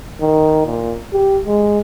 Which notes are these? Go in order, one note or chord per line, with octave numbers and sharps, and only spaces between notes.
D#3
A#2
G4
G#3